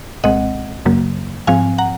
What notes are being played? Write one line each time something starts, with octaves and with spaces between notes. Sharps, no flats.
C2 A#2 G#3 C4 D#5 F#5
F#2 C#3 F#3 A#3
G#2 F3 C4 F5 G#5
F#5 A#5